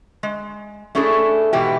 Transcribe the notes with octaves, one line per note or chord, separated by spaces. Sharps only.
G#3
A3 C#4 D4 E4 G#4 A4
G#2 B2 E3 E4 G4